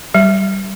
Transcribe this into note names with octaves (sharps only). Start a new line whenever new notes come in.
G3